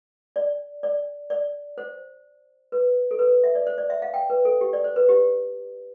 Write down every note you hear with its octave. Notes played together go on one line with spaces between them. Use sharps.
D5
D5
D5
C5
B4
A4
B4
E5
D5
C5
D5
E5
F5
G5
B4
A4
G4
D5
C5
B4
G4